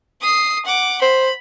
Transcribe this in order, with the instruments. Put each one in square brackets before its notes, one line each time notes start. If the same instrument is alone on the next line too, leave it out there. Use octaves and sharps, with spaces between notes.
[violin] D#6 C7
F#5 D6
[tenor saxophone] C5 [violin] B5